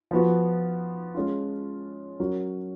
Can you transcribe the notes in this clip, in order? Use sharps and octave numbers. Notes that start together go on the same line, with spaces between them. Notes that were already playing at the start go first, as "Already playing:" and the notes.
F3 B3 F#4
G#3 C#4 F4
F#3 C#4 F#4 A#4 C#5